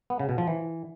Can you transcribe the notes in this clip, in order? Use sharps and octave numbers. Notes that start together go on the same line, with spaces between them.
B3
C#3
B2
F3
E3